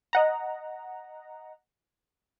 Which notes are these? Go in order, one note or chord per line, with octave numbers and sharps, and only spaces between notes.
D#5 F#5 A#5